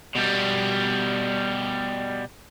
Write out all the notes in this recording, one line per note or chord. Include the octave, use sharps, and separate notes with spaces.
B2 G3